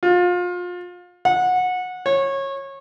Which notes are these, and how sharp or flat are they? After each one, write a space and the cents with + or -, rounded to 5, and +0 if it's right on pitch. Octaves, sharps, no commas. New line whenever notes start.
F4 +30
F#5 -20
C#5 -20